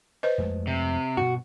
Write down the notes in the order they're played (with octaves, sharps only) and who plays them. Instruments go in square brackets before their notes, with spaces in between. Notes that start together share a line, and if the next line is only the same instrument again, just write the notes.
[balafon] B4 C5 D#5
[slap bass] F2 G#3 A3
[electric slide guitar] C3
[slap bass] G2 B2 [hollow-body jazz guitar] F#4